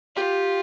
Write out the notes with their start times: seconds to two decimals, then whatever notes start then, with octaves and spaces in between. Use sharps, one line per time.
0.16 F4 G4